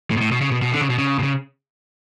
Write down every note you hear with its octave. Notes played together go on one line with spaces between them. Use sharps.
A2
B2
A2
B2
C#3
B2
B2
D3
C#3
B2
C#3
B2
C#3